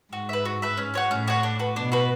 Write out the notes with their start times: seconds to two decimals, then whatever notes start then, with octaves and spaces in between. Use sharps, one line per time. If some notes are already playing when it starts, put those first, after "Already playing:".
0.12 G#2 F#4
0.29 B4 E5
0.45 F#4
0.62 B4 E5
0.77 C#4
0.94 F#4 C#5 F#5
1.11 A2 C#4
1.28 F#4 C#5 F#5
1.43 D4
1.59 F#4 B4
1.76 B2 D4
1.92 F#4 B4